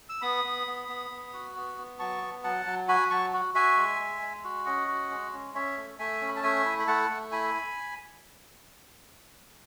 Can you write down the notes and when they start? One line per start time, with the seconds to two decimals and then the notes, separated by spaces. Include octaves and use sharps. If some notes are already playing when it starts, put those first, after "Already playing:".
0.09 E6
0.22 B3 B5 D#6
0.44 B3
0.67 B3
0.88 B3
1.10 B3
1.33 F#4
1.56 B3
1.78 B3
1.99 F#3 A5 C#6
2.21 B3
2.44 F#3 F#5 A5
2.66 F#3
2.88 F#4 G#5 B5
3.10 F#3 A5 C#6
3.33 F#4
3.54 F#4 E5 G#5
3.77 G#3
3.99 G#3
4.22 G#3
4.44 F#4
4.66 C#4 D#5 F#5
4.88 F#4
5.11 G#3
5.33 C#4
5.55 C#4 C#5 E5
5.77 A3
5.99 A3 E5 G#5
6.21 C#4
6.28 B5
6.36 A5
6.43 A3 E5 G#5
6.66 E4
6.79 B5
6.87 A3 F#5 A5
7.09 A3
7.32 E4 G#5 B5